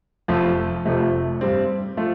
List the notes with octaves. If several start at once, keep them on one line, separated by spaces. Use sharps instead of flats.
F1 F2 F3 A3 F4
F1 F2 C3 A3
G2 G3 C4
F3 A3 F4